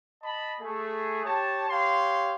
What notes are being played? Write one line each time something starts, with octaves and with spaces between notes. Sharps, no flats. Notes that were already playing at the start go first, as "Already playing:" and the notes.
D#5 A5 B5
A3 G#4
G4 C#5 A5
G4 C#5 F5 C6